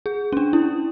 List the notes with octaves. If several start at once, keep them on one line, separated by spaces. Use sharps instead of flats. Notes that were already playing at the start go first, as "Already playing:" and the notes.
G#4
C#4
D4
E4